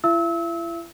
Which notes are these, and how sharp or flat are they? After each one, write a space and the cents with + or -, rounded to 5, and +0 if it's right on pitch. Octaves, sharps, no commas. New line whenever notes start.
E4 +40 E5 +40 E6 -30